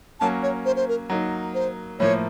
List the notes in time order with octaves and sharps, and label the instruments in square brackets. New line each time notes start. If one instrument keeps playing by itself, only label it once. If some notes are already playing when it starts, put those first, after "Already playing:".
[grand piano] F#3 A#3 C#4 [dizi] A5
[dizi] C#5
C5
C5
A#4
[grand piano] F#3 A#3 D#4
[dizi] C5
[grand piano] A2 F3 A#3 [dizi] C#5